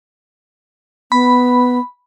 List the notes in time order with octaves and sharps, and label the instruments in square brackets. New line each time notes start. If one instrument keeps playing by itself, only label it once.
[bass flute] B3 [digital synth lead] B5